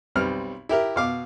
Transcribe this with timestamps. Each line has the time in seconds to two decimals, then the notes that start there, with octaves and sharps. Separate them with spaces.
0.15 B1 G3 C4 F6
0.69 E4 G4 A#4
0.96 B2 F5 D6